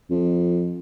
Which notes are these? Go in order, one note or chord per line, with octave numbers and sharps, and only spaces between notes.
F2